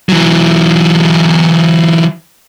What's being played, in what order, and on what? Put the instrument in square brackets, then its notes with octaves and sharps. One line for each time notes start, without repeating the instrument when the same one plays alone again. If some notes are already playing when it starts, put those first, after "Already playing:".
[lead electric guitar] E3 F#3